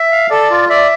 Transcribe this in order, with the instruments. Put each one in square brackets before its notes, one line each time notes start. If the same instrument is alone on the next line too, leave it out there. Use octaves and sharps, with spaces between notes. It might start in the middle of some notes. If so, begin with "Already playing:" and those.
Already playing: [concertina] E5
[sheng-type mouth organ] F5
[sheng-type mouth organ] A4 [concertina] D5
[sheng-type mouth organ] F4
[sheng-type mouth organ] D5 [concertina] E5